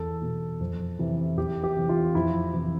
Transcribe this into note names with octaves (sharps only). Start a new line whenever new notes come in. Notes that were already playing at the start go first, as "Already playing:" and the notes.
Already playing: E2 A4
B2
F2
C3 E3
E2 G4
G4
C3 E3
F4
F2 E4
C3 E3